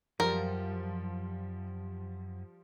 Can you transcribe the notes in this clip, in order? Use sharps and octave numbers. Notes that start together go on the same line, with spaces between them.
F#2 F3 G3 A#4